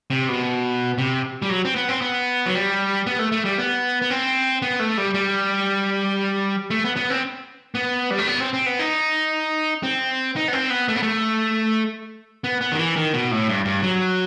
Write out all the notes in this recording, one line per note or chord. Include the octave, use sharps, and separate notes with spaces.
C3
B2
C3
G3
F#3
C4
B3
C4
B3
F#3
G3
B3
A3
A3
G3
B3
B3
C4
B3
A3
G3
G3
A3
B3
B3
C4
B3
G3
A3
B3
C4
C4
B3
D#4
C4
D#4
B3
C4
B3
A3
B3
A3
B3
B3
D#3
E3
D#3
B2
A2
G2
G2
F#3